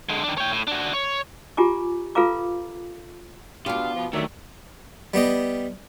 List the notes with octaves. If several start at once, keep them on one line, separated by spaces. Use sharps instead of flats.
D3 G#3
D#3 D4
C#5 G5
A2
D4 F#4
C#5
F4 G4 G#5 A#5 D6
F4 A4 B4 F5 A#5 D6
B2 B3 D4 F4 G4 F5
B2 F3
D#3 F#3 G3 A3 D4 E5
G3 B3 G4 D#5